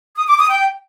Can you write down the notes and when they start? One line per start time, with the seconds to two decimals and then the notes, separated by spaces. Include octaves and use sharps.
0.16 D#6
0.27 D6
0.38 D#6
0.49 G5